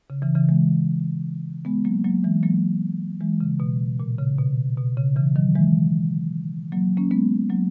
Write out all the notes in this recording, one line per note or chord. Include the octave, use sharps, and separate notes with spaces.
C#3
C#3 E3
C#3 E3
E3 G#3
G#3 B3
F#3 A#3
F#3 A#3
E3 G#3
F#3 A#3
E3 G#3
C#3
B2
A#2
C#3
B2
B2
C#3
C#3 E3
D#3 F#3
E3 G#3
F#3 A#3
A#3 C#4
G#3 B3
F#3 A#3